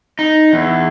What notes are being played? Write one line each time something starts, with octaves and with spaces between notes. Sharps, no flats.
D#4
E2